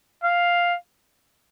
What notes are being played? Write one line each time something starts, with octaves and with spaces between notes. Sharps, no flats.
F5